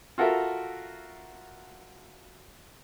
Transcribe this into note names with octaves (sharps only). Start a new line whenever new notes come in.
F4 F#4 A4 A#4 E5